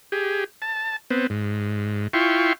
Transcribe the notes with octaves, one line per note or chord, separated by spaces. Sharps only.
G4 G#4
A5
B3 C4
G#2
E4 F4 G5 C6 C#6